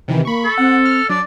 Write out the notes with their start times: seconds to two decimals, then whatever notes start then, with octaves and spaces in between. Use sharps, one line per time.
0.08 C3 D#3 E3 E4
0.25 A#3 B5 C#6
0.44 A4
0.58 C4 F#5
0.85 F6
1.09 F#3 D4 D5